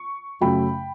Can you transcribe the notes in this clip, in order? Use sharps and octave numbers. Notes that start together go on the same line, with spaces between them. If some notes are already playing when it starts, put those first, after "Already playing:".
Already playing: C#6
F#2 C#3 F#3 A3 G5 B5